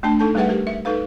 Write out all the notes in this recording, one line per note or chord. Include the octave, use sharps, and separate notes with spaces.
A3 D4 A5
D#4 A4 A5
G3 A3 G#4 B4 E5 F#5
G4 A#4
E5
D#4 A4 B4 F5